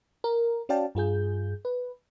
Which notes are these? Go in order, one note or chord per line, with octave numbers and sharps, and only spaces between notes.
A#4
C#4 F#4 D5 F5 G5 A5
G2 F4 G#4 G6
B4